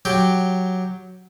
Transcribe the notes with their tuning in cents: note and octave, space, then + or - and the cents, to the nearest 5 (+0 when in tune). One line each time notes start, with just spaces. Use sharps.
F#3 +0 G4 +0 G5 +0